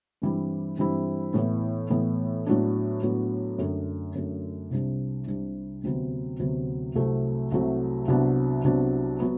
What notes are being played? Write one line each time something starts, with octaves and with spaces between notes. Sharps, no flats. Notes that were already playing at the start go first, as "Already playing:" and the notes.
G2 E3 G3 C4 E4
G2 E3 G3 C4 E4
A2 E3 B3
A2 E3 B3
A2 F#3 B3 D4
A2 F#3 B3 D4
F#2 D3 A3
F#2 D3 A3
C2 C3 G3 D4
C2 C3 G3 D4
D2 C3 F#3 B3
D2 C3 F#3 B3
C2 C3 F#3 A3
C2 C3 F#3 A3
C2 C3 F#3 B3 D4
C2 C3 F#3 B3 D4
F#3 B3